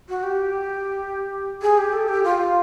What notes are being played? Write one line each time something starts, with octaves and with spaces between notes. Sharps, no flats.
F#4
G4
G#4
G4
A4
G4
F4